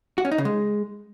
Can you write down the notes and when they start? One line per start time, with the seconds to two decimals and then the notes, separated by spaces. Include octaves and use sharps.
0.18 F#4
0.25 C#4
0.31 D#4
0.38 C#3
0.45 G#3